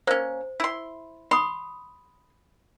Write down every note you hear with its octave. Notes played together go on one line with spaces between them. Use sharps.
A#3 C#4 C5
E4 C6
B5 C6 D#6